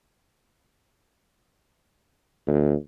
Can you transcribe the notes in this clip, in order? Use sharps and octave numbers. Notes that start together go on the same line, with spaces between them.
D2